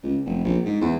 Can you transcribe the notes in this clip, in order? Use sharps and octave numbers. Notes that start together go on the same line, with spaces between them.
C#2
F1
A#1
G#2
E2